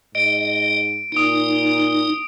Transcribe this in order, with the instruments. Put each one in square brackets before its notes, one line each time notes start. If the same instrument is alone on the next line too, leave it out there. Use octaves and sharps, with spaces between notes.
[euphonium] G#2 [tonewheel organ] D#5 [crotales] D7
[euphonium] A#2 [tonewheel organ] D#4 [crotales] D#6 D7